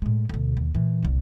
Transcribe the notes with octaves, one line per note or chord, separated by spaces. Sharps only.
A2 G#3
D2 B2
D#2
A#2 E3
D#1 C2